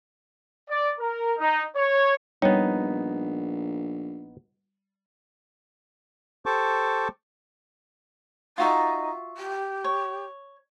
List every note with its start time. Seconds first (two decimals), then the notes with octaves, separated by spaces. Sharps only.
0.68 D5
0.98 A#4
1.36 D#4
1.75 C#5
2.42 A#1 G3 B3 D#4 C#5
6.46 G4 A4 C5 A5 C#6 D6
8.58 D#4 F4 F#4 E5
9.37 G4
9.84 C#5